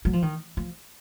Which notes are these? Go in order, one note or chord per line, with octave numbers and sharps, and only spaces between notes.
F#3
F3
D#3
F3